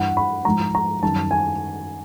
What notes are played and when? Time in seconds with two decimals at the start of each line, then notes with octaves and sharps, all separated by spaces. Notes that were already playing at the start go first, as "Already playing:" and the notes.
Already playing: G2 E3 G3 F#5
0.17 B5
0.45 G#2 F3 G#3 A#5
0.75 A#5
1.02 F#2 D#3 G3 A5
1.31 G#5